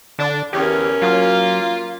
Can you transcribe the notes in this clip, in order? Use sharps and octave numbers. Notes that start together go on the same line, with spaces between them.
D3 D4
E2 C#4 G4 A#4
F#3 A#3 F4